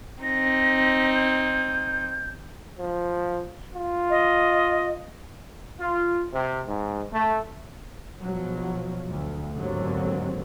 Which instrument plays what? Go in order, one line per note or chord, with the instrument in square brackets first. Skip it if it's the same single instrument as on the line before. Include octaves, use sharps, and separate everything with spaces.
[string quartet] C4 D#4 [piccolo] A#6
[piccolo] G6
[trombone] F3
F4
[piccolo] D#5
[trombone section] F4
C3
G#2
A3
[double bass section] A#1 B2 F3 F#3
D2
A1 D#2 G#2 D3 F#3 C4